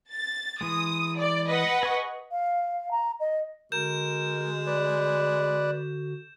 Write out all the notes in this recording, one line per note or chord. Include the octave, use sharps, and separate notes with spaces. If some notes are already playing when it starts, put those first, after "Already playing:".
A6
E3 G#3 D#6
D5
B4 D#5 F#5
G#4 C#6
F5
A#5
D#5
D3 G#3 F#4 A#4 G6 E7
B4 D5